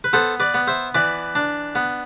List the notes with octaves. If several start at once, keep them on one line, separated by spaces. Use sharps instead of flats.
B4
B3 A4 C5
B4 D5
B3
C5 E5
E3 B4 D5
D4
B3